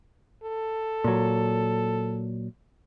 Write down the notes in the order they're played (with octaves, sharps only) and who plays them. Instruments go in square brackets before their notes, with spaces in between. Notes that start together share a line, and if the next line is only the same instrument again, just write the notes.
[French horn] A4
[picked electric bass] A#2 F#3